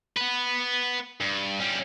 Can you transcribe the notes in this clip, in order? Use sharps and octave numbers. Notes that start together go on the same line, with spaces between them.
B3 B4
G2
G3 C#4